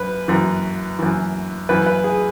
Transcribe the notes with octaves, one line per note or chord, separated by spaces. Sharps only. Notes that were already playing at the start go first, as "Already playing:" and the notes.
Already playing: F#2 B4
F#2 E3
F#2 E3
F#2 E3 B4
B4
G#4